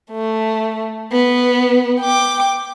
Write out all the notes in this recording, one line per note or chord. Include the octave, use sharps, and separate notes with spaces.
A3
B3
G5 D6